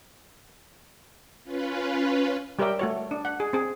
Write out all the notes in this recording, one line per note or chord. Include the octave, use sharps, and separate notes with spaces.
C#4 F4 B4
G3 G4 A#4 C#5 E5 G5
A3 F#4 C#5
D4
F#5
G#4
C4 G#4